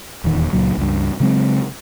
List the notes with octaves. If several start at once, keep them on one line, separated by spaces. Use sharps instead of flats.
D#1 E2 D#3
C#2 A#2 F#3
C#2 G2
C#3 F#3 G#3 C4